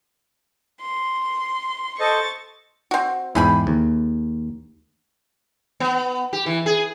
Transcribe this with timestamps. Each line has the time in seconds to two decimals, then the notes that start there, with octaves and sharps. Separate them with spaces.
0.81 C6
2.00 A4 C5 D#5 C#6 A6
2.91 C4 F#4
3.35 E2 G#2 E4 G#4 G5 B5
3.67 D#2
5.80 B3
6.33 G4
6.46 E3
6.66 G#4